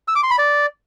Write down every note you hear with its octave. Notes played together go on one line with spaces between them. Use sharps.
E6
D6
C6
B5
D5